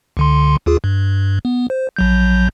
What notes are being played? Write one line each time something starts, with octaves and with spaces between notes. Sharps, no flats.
C#2 D3 C6
D#2 F4 G#4
G2
B3
C5
A#1 F#3 G6